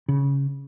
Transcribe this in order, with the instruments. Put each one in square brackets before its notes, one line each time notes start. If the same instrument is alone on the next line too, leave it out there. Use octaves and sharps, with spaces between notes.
[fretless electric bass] C#3